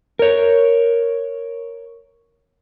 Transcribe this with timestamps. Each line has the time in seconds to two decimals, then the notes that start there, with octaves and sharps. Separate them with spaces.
0.19 A#4 C#5